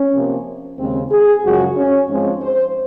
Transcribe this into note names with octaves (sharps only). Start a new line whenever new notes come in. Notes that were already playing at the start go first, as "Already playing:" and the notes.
Already playing: C#4
C3 F3 A#3
D#2 C#3 G#3 C4
G#4
F#2 C#3 F3 G#3 F#4
C#4
G#2 F3 G#3 C4 C#4
C5